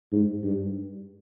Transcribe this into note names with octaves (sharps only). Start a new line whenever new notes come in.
G#2
G2